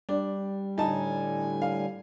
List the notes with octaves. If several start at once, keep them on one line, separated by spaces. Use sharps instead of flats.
G3 D4
A2 D3 D#4 G#5 A5
F5